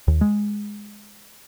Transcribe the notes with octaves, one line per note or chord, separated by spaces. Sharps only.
D#2
G#3